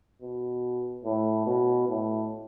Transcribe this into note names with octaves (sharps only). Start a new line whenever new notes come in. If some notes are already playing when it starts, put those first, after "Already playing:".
B2
A2
B2
A2